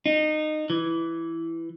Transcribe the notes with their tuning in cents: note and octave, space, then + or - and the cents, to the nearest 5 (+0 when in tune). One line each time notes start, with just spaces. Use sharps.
D#4 -20
E3 +5